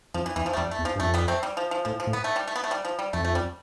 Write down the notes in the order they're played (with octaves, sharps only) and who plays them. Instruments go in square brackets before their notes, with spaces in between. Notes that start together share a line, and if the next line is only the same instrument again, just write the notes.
[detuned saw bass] F2 [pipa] F3
[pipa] E3
[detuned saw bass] E2 [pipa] E3
[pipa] F3
A3
[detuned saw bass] F2 [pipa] G3
[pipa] A3
[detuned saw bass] E2
[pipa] F3
[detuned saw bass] G2
[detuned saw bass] F2 [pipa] A3
[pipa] G3 B3
A3 C4
G3
F3
F3
[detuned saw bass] A2 [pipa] F3
[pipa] F3
[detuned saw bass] A2
[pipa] B3
A3
G3
A3
B3
A3
G3
F3
G3
[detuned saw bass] F2 [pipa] A3
[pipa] A3
G3